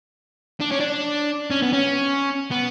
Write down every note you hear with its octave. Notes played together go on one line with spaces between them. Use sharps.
D4
C#4
D4
C#4
B3
C#4
B3